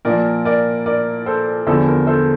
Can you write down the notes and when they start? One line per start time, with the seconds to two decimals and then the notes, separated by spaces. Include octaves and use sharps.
0.05 A#2 F3 A#3 A#4 D5
0.45 A#4 D5
0.86 A#4 D5
1.26 A4 C5
1.67 E2 D3 F3 C4 A4
1.87 A#4
2.07 A4 C5